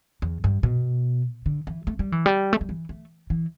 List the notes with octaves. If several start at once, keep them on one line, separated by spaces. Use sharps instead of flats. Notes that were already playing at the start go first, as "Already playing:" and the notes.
E2
G2
B2
D3
E3
A3
G3
E3
G3
A3
G3
E3
A3
E3